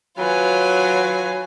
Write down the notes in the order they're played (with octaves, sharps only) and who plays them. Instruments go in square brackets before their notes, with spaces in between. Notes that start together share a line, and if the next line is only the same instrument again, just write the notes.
[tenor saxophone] F#3 [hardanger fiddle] F4 G#5 [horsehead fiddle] B4